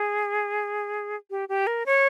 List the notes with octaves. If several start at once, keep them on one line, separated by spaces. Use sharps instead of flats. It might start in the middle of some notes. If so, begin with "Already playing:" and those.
Already playing: G#4
G4
G4
A#4
C#5